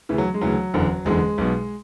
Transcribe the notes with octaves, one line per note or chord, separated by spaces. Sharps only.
D2 C#3 E3
F#3
G#3
D2 C#3 E3 F#3
F#1 E2 D3
F#1 E2 D3 G#3
B1 B2